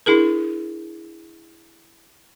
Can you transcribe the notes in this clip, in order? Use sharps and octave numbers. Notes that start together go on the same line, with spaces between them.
D4 E4 G#4 A#4